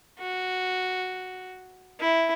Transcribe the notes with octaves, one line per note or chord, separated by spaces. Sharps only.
F#4
E4